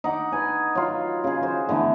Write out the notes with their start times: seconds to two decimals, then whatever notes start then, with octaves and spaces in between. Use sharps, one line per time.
0.04 D#4 F#5 D6
0.32 B4 G#5
0.75 F#3 F4
1.24 C#3 G#4
1.43 F#4 C5
1.69 D3 E3 A3 B3